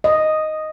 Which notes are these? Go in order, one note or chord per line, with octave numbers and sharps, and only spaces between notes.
D#5